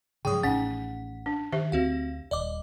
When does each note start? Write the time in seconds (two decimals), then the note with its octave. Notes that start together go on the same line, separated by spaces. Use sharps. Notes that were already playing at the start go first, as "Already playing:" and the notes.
0.25 G#2 C#3 F3 F#3 G#4 G5 D#6
0.43 A1 C#4 D#4 F#5 B6
1.26 D4
1.52 D#3 G4 C5 E5
1.72 D2 C4 F#4 F5
2.31 D#1 D5 D#5 D6